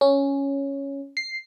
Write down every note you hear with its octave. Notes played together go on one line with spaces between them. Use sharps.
C#4
C7